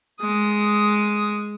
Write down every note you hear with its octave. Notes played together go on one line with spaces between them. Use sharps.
G#3 D#6